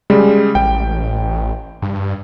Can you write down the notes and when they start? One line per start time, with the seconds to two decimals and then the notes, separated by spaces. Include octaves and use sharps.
0.10 C#3 G3 G#3
0.55 A1 G5
1.82 G2